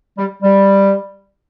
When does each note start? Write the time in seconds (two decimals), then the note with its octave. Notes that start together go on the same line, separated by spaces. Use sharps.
0.17 G3
0.43 G3